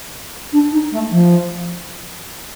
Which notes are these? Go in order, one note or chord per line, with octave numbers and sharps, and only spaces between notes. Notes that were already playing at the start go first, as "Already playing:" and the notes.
D4
D#4
A3
F3